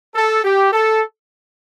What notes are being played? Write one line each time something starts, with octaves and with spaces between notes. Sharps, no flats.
A4
G4
A4